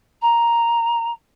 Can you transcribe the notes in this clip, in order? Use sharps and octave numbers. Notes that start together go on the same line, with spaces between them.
A#5